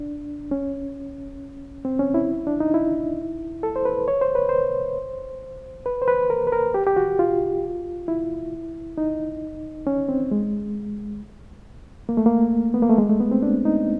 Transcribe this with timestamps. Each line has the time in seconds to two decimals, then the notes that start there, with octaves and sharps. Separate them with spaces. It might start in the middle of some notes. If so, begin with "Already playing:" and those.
Already playing: D4
0.51 C#4
1.85 C4
1.99 C#4
2.14 E4
2.47 D4
2.60 D#4
2.74 E4
3.63 A4
3.76 C5
3.85 B4
4.08 C#5
4.21 C5
4.35 B4
4.49 C5
5.86 B4
6.02 C5
6.08 B4
6.30 A#4
6.47 B4
6.52 A#4
6.74 G4
6.87 G4
6.96 F#4
7.19 F4
8.08 E4
8.98 D#4
9.87 C#4
10.09 C4
10.31 G#3
12.09 A#3
12.17 A3
12.26 A#3
12.74 B3
12.82 A#3
12.90 A3
12.98 G#3
13.09 A3
13.20 B3
13.31 C4
13.43 D4
13.65 D#4